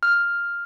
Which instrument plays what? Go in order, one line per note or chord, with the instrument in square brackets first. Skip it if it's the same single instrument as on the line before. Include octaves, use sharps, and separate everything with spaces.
[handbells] F6